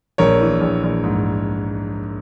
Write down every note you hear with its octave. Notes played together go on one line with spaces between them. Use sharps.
A#1 A#4 C#5
E3
A#1
A#1
G#2